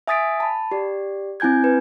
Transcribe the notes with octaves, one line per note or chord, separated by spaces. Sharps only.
E5 G#5 D#6 A6 B6 D7
A5 B5
G4 D5
C4 E4 G#5 G6 G#6
B4